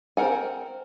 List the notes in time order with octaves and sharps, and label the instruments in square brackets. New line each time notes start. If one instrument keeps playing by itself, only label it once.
[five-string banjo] C4 A#4 F#5 G#5